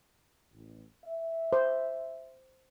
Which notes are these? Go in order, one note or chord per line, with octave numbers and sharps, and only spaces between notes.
A1
E5
C5